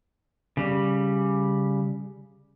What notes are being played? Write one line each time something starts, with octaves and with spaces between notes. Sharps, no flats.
C#3 G3